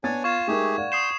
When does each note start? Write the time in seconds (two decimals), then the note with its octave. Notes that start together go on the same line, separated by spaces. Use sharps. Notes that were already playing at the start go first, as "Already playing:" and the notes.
0.04 B3 D4 C#5 D5 G#5 A6
0.24 F4 F5 C#6 G#6 E7
0.48 G#3 A3 D#4 G4 G#4 A#4
0.78 D5 F5 F#5
0.92 C6 D#6 G6 C7 E7